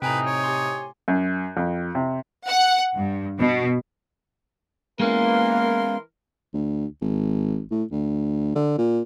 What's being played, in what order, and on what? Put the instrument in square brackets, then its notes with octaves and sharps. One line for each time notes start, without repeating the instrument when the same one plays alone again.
[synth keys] A2 C3 [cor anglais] D#4 [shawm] B4 [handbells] G5 G#5 A#5
[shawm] C#5
[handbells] G4 G#5 C6
[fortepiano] F#2
F2
C3
[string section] F#5
G2
B2
[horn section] E3 A#4 C6 [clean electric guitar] G#3 B3 C#4 [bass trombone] A#3 [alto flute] F5
[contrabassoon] D2
G#1
A2
D2
D3
A#2